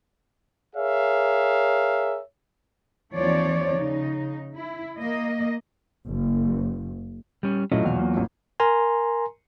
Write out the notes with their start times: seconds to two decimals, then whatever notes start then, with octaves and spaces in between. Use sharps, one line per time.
0.76 G#4 A#4 C#5 E5 F5
3.13 D#2 E3 F3 C4 C#5 D5
3.73 C#3 D#4
4.55 E4
5.00 A#3 D#5
6.06 F#1
7.43 G3 C#4
7.72 A#2 F#3 A3 C#4 E4 F4 D#5
7.85 B1 E2 A#2 F5
7.99 A#3
8.14 A1 F2
8.60 A#4 G#5 A#5 C6